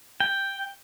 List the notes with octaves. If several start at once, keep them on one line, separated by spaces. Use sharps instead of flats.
G5